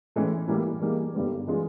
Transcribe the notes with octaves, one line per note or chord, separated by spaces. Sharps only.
A2 E3 G#3 C#4
A2 E3 G3 A#3
E3 G3 A#3 D#4 G#4
G2 D3 G3 B3
E3 G#3 C#4 F4 G#4